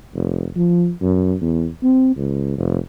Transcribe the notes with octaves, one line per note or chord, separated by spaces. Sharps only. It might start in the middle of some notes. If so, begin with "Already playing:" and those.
F1
F3
F#2
E2
C4
C#2
F1